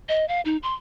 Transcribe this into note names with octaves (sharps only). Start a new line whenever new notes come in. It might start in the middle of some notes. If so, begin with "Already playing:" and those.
D#5
F5
D#4
C6